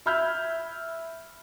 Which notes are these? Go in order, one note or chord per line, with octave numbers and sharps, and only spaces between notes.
E5 B5 E6 F6 G6 G#6